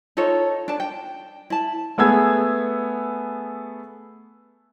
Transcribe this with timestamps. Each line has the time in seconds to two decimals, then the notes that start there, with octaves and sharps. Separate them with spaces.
0.17 D#4 F4 A4 C#5
0.68 D4 A5
0.80 G5
1.50 E4 A5
1.98 A3 B3 G#4 E6 G#6